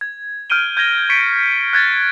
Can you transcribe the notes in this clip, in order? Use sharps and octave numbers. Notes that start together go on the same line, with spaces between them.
G#6
F6 G6 D7 D#7 G7
G6 G#6 A#6 G7
C#6 A6 B6 C#7 D7
F#6 G#6 A6